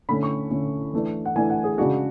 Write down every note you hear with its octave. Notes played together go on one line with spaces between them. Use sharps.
D3 A3 C#4 B5
C#6
D3 A3 C#4
E3 A3 D4
F#5
E3 A3 D4 G#5
F#5
G#4
C#3 G#3 D4 F#4